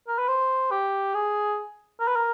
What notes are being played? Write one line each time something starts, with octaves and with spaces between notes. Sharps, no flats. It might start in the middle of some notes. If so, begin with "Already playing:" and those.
A#4
B4
C5
G4
G#4
A#4
B4
A#4